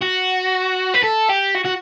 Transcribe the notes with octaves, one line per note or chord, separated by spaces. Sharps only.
F#4
B4
A4
G4
F#4
F#4